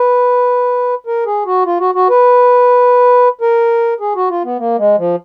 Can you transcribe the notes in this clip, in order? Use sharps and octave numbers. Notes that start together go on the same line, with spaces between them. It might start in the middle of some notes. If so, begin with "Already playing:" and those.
Already playing: B4
A#4
G#4
F#4
F4
F#4
F#4
B4
A#4
G#4
F#4
F4
B3
A#3
G#3
F3